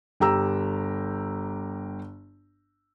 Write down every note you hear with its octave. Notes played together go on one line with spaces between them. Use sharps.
G1 G4 A#5 E6